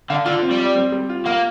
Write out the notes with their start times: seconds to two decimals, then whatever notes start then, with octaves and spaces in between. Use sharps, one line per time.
0.10 D3 F5
0.26 D3 F4
0.42 C4
0.51 G3
0.59 D5
0.76 C4
0.92 G3
1.09 F4
1.26 A#3 F5